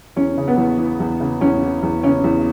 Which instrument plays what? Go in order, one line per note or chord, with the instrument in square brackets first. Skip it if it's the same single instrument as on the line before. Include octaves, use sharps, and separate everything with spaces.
[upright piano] E2 C#4
C#3
B3
E2
E3
E2
C#3
E2 C#4
E3
E2
C#3 C#4
E2